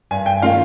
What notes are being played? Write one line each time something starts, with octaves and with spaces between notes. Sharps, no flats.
G2 G#5
G5
D#3 A#3 C#4 F4 F5